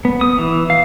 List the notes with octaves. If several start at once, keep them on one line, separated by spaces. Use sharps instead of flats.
B3
D#6
E3
F5